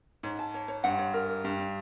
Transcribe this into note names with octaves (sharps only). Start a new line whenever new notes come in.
G#2 C#5
A5
C#5
C#5
G2 F#5
C#5
A#4
A#4
G2 G4
D4